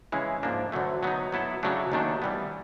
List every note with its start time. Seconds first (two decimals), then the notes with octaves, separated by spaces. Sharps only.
0.12 C#3 E3 G#3 C#4 E4
0.43 G#2 F3 A#3 D4
0.72 D2 D3 F#3 A3
1.03 F#3 B3 D#4
1.32 F#3 B3 E4 A4
1.63 C#3 F#3 A3 D4
1.92 D#2 D#3 F#3 A3 D4
2.22 E3 G3 B3